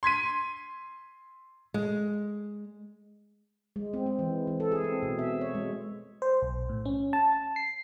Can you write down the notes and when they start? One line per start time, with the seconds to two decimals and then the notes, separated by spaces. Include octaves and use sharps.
0.03 C6 G#6 B6 D#7
1.74 G#3
3.76 G#3
3.94 C4
4.06 C4
4.19 E3
4.47 E3
4.60 A4
4.72 G#4
4.84 C4
5.03 B2
5.19 E5
5.41 C#5
5.55 G#3
6.22 C5
6.42 B1
6.69 A2
6.85 C#4
7.13 A5
7.56 C7